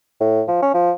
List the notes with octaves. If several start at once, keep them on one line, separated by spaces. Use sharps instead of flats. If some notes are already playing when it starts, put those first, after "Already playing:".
A2
F3
C#4
F3